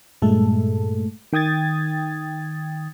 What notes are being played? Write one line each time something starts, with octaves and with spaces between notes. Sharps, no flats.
G2 A#2 G#3 A3 A4
D#3 G5 D#6 G#6 A6